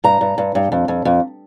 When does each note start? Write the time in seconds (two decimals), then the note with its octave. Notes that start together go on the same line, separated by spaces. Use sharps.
0.04 G2 A#5
0.21 G2
0.38 G2
0.55 G2
0.72 F2
0.88 F2
1.05 F2